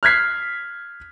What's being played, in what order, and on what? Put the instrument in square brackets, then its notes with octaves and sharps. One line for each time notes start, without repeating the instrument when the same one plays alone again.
[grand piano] F6 F#6 G#6 B6 C7